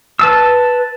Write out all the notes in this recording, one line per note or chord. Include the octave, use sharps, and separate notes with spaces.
B4 A5 E6